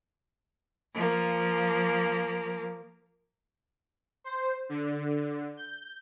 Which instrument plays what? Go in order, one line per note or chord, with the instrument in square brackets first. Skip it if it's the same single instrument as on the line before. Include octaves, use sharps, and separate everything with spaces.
[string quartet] F3 A#3
[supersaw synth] C5
D3
G6